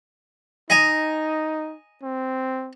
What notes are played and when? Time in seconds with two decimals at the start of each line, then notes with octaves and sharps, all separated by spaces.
0.70 D#4 D#5 G#5 A#5
2.02 C4